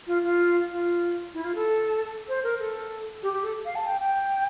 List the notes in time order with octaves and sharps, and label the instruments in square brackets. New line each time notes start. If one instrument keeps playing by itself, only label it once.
[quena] F4
F4
F4
E4
F4
A4
C5
A#4
A4
G4
G4
A4
F5
A5
G5
G5